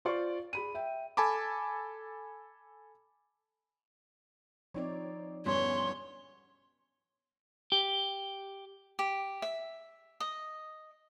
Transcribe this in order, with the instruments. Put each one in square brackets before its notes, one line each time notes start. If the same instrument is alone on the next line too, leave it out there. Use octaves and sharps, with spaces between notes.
[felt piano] F4 C5 D5 C#6
G#4 B5 D#7
E5 G5
[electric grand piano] A4 G#5 A5 B5 D6
[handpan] F3 D#4 D5 [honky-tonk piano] C4 C#5
[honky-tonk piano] G1 E2 B2 [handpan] G3 B3 C#4 [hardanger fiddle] C#5 [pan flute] C6
[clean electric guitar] G4
[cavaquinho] G4
E5
D#5